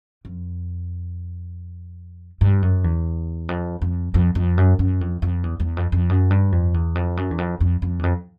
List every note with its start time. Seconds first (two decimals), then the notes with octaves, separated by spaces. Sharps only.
0.25 F2
2.41 G2
2.62 F#2
2.84 E2
3.49 F2
3.82 F2
4.14 F2
4.35 F2
4.58 F#2
4.79 F#2
5.01 F2
5.22 F2
5.44 E2
5.60 E2
5.77 F2
5.92 F2
6.09 F#2
6.31 G2
6.52 F2
6.74 E2
6.95 F2
7.17 F#2
7.31 E2
7.38 F2
7.60 F2
7.82 F2
7.99 E2
8.04 F2